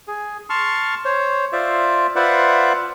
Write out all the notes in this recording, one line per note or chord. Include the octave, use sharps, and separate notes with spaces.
G#4
A5 C6 C#6 F6
C5 C#5
F4 C5 D5 E5
F4 B4 C5 D5 E5 F#5